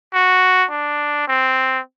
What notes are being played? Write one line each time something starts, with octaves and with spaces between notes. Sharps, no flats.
F#4
D4
C4